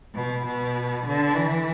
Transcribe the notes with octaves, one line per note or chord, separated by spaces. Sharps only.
B2
B2
D3
E3